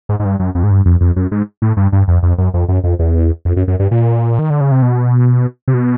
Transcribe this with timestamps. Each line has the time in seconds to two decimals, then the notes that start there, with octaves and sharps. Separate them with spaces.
0.09 G#2
0.20 G#2
0.25 G2
0.40 F#2
0.55 F2
0.63 G#2
0.71 G2
0.85 F2
1.01 F2
1.16 F#2
1.32 G#2
1.62 A2
1.77 G2
1.92 G2
2.08 F2
2.23 F2
2.38 F#2
2.54 F2
2.68 F#2
2.84 F2
2.99 E2
3.45 F2
3.56 F#2
3.68 F#2
3.80 G2
3.91 A#2
4.39 D#3
4.50 D3
4.61 C#3
4.72 C3
4.82 B2
5.68 C3
5.74 B2